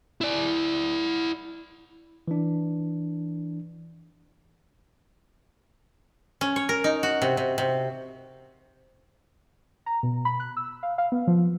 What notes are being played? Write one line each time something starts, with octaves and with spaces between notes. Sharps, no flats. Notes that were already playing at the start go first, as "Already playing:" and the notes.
E4 D5
E3 D4
C#4
C#5
A#4
D#4
F#4
C3
C3
C3
A#5
B2
B5
F#6
E6
F5
F5
B3
F3